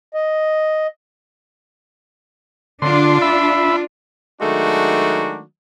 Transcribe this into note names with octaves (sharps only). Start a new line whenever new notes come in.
D#5
D3 D4 F4 C6
E5 B5
D#3 F#3 G#3 A3 D4 F#4